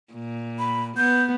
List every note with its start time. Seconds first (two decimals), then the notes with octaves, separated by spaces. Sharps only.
0.13 A#2
0.59 B5
0.97 B3 G6